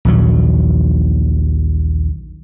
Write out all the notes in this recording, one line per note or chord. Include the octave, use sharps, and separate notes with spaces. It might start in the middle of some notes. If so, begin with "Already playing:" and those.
A#1 D#2 F#3